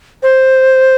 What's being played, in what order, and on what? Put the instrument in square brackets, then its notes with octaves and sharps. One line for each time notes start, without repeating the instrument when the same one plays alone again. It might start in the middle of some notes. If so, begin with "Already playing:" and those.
[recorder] C5